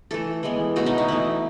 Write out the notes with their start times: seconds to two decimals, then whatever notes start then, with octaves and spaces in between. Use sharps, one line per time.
0.11 E3 A3 A4
0.43 E3 G#3 B3
0.76 B2 A3 F#4
0.86 D#4
0.98 D#4
1.08 E3 A3 E4